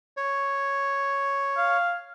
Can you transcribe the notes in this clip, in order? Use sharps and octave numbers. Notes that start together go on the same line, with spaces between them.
C#5
F5